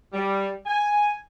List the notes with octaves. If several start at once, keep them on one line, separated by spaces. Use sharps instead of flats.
G3
G#5